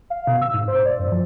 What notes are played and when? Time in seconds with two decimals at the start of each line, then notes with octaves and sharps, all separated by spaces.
0.10 F5
0.27 B2
0.41 E6
0.54 G#2
0.68 C5
0.86 D5
0.99 F#2
1.12 F3